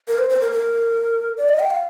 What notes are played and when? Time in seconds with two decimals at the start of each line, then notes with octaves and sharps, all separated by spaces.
0.08 A#4
0.19 C5
0.30 C5
0.41 A#4
0.52 A#4
1.38 D5
1.49 D#5
1.59 G5
1.70 F5